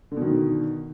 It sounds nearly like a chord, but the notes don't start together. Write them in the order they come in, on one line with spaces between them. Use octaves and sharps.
D3 B2 D#3